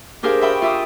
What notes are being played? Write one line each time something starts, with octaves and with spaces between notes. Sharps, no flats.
D4 G4 G#4 A#4 C5 F5
E5 F5 G5 B5 C#6 D#6
F4 E5 D6 D#6